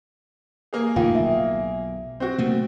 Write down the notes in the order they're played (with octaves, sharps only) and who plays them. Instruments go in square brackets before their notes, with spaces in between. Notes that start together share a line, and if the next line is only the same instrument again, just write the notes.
[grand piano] A#3 G#4
[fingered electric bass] F1 A2 D#3 [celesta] F4 F5 G5
[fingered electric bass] B1 [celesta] E5
[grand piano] C4 F#4
[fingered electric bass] B2 A3 A#3